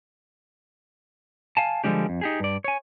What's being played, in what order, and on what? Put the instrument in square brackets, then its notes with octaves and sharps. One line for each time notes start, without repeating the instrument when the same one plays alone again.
[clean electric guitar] F5 G#5 A5
D3 F3 G3 G#3 D4 G4
F2
D#4 G4 G#4
G2 D5
C#5 G#5